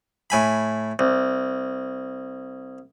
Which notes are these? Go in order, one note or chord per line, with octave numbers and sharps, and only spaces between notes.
A2 G#5 B5
C2